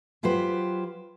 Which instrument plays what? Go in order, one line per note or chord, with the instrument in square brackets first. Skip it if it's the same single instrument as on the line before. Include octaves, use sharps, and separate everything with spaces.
[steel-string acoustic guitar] F#3 F4 G4 B4 C5